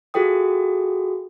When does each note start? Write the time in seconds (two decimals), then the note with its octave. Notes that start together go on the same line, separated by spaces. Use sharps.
0.14 F4 F#4 G#4 A4 G5 D#6